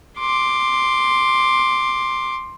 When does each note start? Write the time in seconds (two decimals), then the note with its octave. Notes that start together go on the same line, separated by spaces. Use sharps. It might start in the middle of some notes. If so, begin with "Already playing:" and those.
0.18 C6 D6